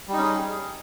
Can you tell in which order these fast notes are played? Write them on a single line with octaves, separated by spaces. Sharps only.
G3 D#4 C#4 G#4